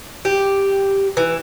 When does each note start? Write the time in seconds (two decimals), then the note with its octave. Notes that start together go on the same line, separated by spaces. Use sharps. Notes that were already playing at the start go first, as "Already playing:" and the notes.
0.25 G4
1.17 E3